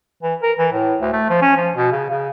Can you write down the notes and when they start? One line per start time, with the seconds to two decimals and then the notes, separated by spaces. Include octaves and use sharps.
0.23 E3
0.43 A#4
0.59 E3
0.73 A2
1.01 D2
1.13 A3
1.30 F3
1.42 C#4
1.57 F3
1.76 B2
1.92 C#3
2.10 C#3